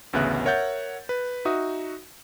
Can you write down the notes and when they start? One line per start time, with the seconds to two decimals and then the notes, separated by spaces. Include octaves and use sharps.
0.13 A1 D2 C#3 B3 E5 F#6
0.45 A#4 C#5 E5 F#5 G6 A6
1.09 B4
1.45 D#4 F#4 E5 D#6